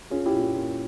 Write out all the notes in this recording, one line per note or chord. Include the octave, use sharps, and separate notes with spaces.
C#4 F4 G#4
E4 G4
A#2
E4
A#2 F4